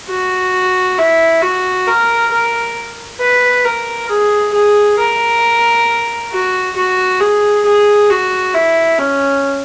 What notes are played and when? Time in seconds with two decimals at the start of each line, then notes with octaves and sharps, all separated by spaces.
0.08 F#4
0.98 E4
1.42 F#4
1.87 A#4
2.31 A#4
3.20 B4
3.65 A#4
4.09 G#4
4.54 G#4
4.98 A#4
6.32 F#4
6.76 F#4
7.21 G#4
7.65 G#4
8.10 F#4
8.54 E4
8.99 C#4